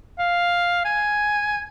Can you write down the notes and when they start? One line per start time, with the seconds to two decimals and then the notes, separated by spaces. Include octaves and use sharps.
0.19 F5
0.85 G#5